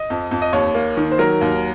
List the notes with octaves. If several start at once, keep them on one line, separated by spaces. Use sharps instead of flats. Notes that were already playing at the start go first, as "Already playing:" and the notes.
Already playing: D#5
F2
F2
D#5
D#2 C#5
A#3
D#3
C5
F#3 A#4
D#2